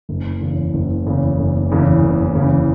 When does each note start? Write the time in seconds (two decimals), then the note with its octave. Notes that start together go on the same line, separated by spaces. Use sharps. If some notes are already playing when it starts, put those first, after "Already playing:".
0.09 F#1
0.41 E2 C#3 E3
0.73 F#1
1.06 E2 C#3 E3
1.39 F#1
1.70 E2 C#3 E3
2.02 F#1
2.34 E2 C#3 E3